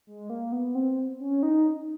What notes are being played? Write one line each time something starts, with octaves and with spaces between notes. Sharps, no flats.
G#3
A#3
B3
C4
C#4
D#4